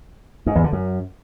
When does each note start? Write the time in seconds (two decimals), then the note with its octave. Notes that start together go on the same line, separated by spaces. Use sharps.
0.46 G#2
0.55 E2
0.64 D3
0.72 F#2